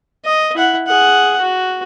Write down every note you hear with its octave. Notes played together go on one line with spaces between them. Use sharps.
D#5
E4 F#5
G#4 F#5
F#4